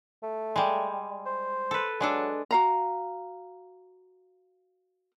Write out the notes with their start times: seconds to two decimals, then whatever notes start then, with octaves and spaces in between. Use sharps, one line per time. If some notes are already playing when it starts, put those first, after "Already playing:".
0.23 A3
0.56 G3 G#3
1.26 C5
1.71 A4 B4
2.00 F#3 G#3 D4 A4
2.51 F#4 F5 A#5